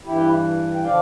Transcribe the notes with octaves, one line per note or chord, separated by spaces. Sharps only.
G2 E3 E4 G4
G5
D3 F3 D5 F5